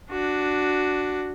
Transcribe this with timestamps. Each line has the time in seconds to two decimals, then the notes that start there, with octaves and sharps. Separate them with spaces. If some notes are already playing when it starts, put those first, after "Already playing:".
0.11 D4 F#4